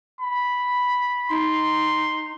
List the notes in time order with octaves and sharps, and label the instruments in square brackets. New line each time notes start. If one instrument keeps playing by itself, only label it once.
[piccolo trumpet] B5
[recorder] D#4 [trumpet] C6